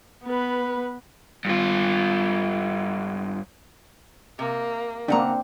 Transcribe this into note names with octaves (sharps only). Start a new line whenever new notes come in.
B3 B4
G2 F4
C3 A#3
C#3 A#3 C4 D4 F#5 A#5